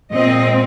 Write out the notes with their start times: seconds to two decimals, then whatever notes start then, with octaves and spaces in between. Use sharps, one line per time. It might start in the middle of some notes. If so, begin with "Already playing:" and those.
0.12 A#2 G#3 C4 D#5